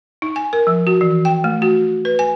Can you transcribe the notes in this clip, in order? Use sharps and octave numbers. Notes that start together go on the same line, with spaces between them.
D#4
G#5
A#4
F3
F#4
E3
G5
A3
F#4
B4
G#5